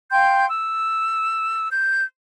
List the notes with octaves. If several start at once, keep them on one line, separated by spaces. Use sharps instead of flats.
F5 G5 C6 G6
E6
G6